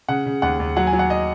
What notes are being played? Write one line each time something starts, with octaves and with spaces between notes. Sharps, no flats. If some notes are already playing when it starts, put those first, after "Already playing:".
C#3 F#5
C#3
D#2 F#5
D#2
F#3 F#5
G#5
F#3
F#5
D#5